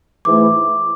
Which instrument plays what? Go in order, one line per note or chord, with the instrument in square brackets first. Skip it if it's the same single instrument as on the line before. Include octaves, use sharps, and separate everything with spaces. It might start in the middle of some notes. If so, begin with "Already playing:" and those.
[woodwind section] G#2 E3 A3 E4 [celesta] D6